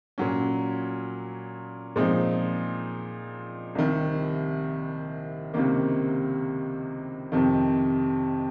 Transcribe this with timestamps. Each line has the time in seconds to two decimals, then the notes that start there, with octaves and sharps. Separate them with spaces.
0.18 A#2 F#3 C#4
1.96 A#2 F3 G#3 C4 D#4
3.75 C2 C3 D#3
5.54 C#2 C3 D#3 A#3
7.32 F2 C3 D#3